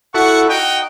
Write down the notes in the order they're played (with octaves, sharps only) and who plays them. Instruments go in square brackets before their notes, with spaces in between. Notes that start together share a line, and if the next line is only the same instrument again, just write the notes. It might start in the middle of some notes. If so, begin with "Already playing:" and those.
[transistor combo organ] E4 F#4 A4 [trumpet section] F#5 C#6
[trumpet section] D#4 F#4 G5 [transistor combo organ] D#5